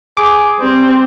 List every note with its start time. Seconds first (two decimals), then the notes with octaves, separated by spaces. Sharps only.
0.17 G#4 D6
0.60 G3 C4